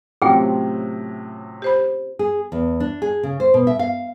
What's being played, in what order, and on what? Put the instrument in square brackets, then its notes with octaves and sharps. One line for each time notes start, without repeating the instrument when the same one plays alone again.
[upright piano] A2 C3 F#3 [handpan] C4 C#4 F4 [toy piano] G#4 G5
[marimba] G4 C5 B5
[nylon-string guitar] G#4
E2
D4
G#4
C#3
C5
B2
E5
F5